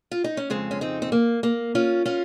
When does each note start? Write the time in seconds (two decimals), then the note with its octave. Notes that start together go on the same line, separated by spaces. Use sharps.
0.11 F4
0.24 D#4
0.37 C#4
0.50 F2 C#3 G#3 C4
0.71 C#4
0.81 C4 D#4
1.02 C4
1.12 A#3
1.43 A#3
1.75 C#4 F4
2.05 C#4 F4